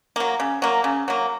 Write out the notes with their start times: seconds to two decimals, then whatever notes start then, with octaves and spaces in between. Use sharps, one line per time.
0.16 F#3 A#3
0.40 C#3
0.62 F#3 A#3
0.84 C#3
1.08 F#3 A#3